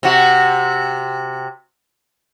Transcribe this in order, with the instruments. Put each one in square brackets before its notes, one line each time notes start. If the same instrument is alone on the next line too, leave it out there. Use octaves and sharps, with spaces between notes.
[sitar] C3 F#4